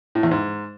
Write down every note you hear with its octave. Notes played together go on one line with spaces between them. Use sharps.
A2
E2
G#2